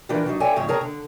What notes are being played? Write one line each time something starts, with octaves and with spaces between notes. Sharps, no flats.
A#2 E3 F3 D4 G4 A#4
F#3 D4 D#4
A4 C#5 D5 E5 G5 G#5
D2 G#2 C#3 F3 C4 C#5
G#4 A#4 C#5 G5 A5 A#5
D3